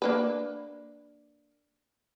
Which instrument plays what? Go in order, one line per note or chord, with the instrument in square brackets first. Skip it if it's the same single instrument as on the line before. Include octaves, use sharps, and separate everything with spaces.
[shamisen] A#3 D4 B4